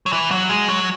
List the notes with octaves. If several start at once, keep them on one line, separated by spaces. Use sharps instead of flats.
F#3
E3
F#3
G#3
F#3